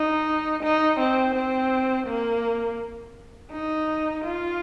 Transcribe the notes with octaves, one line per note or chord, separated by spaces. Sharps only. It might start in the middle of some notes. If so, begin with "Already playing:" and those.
Already playing: D#4
D#4
C4
C4
A#3
D#4
F4